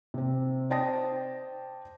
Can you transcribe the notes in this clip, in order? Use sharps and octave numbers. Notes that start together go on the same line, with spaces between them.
C3 C4
C5 D5 G5 A5 D#6 A#6